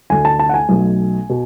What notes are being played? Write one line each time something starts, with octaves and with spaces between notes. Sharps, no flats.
D2 D3 A3 G#5
A5
A5
F#5
G#5
B1 B2 A3
B2